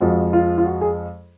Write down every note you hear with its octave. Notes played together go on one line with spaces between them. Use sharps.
F2 F3 G#3 F#4
F4
F4
F#4
G#4